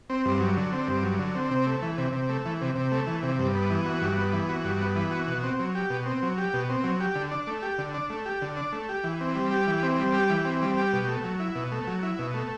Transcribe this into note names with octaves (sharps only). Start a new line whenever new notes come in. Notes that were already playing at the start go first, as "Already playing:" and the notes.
C4
G2
F#3
D3
C4
G2
F#3
D3
C4
C3
A3
E3
C3
C3
A3
E3
C3
C3
A3
E3
C3
G2
B3
E3
F#4
G2
B3
E3
F#4
G2
B3
E3
F#4
B2
C4
F#3
G4
B2
C4
F#3
G4
B2
C4
F#3
G4
D3
D4
A3
G4
D3
D4
A3
G4
D3
D4
A3
G4
E3
C4
G3
G4
E3
C4
G3
G4
E3
C4
G3
G4
B2
A3
F#3
E4
B2
A3
F#3
E4
B2
A3